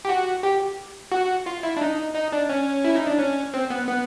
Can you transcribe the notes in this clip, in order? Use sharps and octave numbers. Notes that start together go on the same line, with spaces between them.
G4
F#4
G4
F#4
F4
E4
D4
D#4
D#4
D4
C#4
E4
D#4
D4
C#4
C4
B3
B3